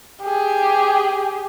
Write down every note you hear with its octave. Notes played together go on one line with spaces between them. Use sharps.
G4 G#4